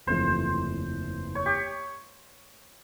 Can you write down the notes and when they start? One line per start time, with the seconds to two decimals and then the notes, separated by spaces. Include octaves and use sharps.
0.07 F#1 E2 C3 F3 A3 C5
1.35 C#5
1.46 G4